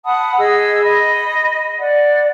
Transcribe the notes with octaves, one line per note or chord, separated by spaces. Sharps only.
F#5 A5 B5 D#6
G#4 D#5 E6
D#5 B5
D5 F#5